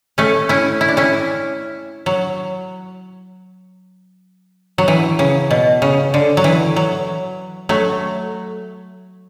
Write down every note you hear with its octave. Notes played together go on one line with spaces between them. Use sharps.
A3 C#4
C#4 E4
E4
D4
C#4 E4
F#3
F#3
E3
C#3
B2
C#3
D3
F#3
E3
F#3
F#3 A3